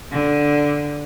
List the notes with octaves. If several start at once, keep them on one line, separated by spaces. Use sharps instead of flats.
D3